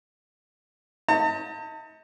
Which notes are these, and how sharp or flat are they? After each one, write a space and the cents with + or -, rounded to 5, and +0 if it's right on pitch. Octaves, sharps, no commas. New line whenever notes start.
D#4 +35 A5 +45